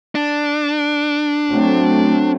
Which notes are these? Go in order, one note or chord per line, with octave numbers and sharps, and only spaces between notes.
D4
F#3 A3 C4